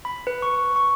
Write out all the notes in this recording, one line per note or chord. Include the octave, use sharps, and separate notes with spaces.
B5
B4
C#6
C#6